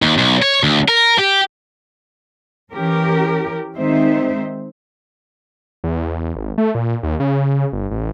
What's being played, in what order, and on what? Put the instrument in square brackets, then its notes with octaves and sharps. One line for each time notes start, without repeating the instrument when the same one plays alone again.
[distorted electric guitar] D#2
B1
C#5
D2
A#4
G4
[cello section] E3 C#4 G4 A#4
D#3 G#3 C4 D#4 C5 E5
[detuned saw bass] E2
G#1
A3
A#2
D#2
C#3
G1
A1